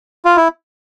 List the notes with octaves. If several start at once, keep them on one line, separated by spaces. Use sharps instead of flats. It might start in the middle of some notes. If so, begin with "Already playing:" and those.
F4
E4